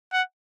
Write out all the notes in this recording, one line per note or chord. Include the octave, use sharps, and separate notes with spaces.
F#5